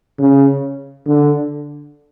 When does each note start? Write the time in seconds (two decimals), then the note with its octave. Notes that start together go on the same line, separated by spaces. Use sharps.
0.19 C#3
1.06 D3